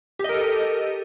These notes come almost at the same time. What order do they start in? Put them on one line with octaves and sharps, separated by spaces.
G4 D#5 A#4 A4